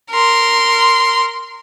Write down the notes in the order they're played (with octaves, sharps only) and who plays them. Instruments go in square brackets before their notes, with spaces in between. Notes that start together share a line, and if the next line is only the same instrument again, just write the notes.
[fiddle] A#4 C6